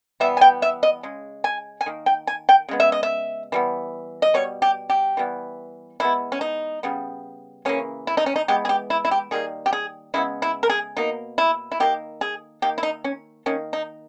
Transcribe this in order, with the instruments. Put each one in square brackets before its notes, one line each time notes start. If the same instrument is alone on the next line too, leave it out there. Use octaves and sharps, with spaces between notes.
[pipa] E3 G3 B3 E5
G#5
G5
E5
D#5
C#3 G#3
G#5
G#5
D#3 A#3
G5
G#5
G5
C#3 G#3 B3
E5
D#5
E5
E3 G3 B3
D#5
B2 G3 C#5
G4
G4
E3 G3 B3
E3 G#3 B3 E4
C#4
D#4
C#3 G3 B3
C#3 E3 A#3 C#4
E4
D#4
C#4
D#4
E3 G#3 B3 G4
G#4
G4
E4
E4
G4
D#3 G3 A#3 G#4
G4
G#4
C#3 G#3 B3 E4
E4
A#4
G#4
B2 A#3 D#4
E4
E4
D#3 A#3 G4
G#4
D#3 A#3 G4
E4
D#4
C#4
D#3 A#3 C#4
D#4